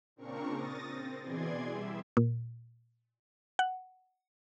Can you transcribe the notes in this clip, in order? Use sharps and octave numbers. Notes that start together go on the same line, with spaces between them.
A#2 C#3 C4 D4 A#4 C#6
D#6 A6 A#6
C4
B2 E3 G#4 D5 C6 G#6
G3 E5
A#2
F#5